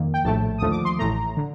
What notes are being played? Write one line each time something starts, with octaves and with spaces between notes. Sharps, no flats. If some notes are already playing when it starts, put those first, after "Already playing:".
Already playing: F2 D#3 A#3
G5
A#1 A2 A3 A5
D#2 D3 F3 A3 D#6
D6
C6
A1 A2 A3 A#5
D3